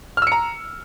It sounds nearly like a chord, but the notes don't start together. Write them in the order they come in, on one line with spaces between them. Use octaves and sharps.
F6 E6 C#7 A#5